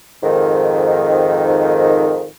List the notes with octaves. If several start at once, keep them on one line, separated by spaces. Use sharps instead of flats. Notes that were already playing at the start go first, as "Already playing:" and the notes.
F2 G#2 D#3